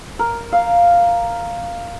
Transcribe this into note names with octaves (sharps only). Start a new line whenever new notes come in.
A#4
F5